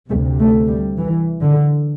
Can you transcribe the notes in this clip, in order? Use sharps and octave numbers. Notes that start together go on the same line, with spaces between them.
D2 C3 A3
A3
G3
E3
D3